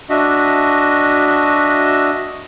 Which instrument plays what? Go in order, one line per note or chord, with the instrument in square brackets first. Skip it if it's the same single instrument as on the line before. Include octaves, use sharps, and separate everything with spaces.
[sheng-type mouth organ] D4 F#4 D#5 E5